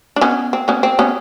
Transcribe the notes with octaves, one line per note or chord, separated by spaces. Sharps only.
D4
B3 C#4
C4
B3 C#4
C4
B3 C#4